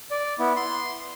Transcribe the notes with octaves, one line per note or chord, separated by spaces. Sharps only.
D5
B3 E4
C6